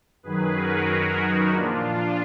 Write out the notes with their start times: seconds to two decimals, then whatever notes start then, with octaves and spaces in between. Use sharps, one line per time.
0.23 F#2 D#3 F#3 G#4 B4
0.56 F#4 A#4
1.21 D#4 F#4
1.54 A#2 F3 D4 F4